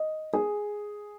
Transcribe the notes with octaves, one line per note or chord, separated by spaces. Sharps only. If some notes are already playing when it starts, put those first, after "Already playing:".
Already playing: D#5
G#4